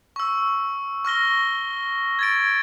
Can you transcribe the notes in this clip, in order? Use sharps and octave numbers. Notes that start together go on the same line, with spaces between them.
C#6 E6
C#6 F6 A#6 G7
G#6 A6 D7